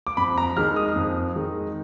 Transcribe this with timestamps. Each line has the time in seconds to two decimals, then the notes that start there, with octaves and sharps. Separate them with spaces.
0.07 D6
0.17 F2 B5
0.38 A#5
0.57 D#3 G#3 D#4 F6
0.76 D#6
0.96 F2
1.35 D#3 G#3 D#4